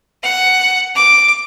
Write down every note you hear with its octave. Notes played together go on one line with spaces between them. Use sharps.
F#5
D6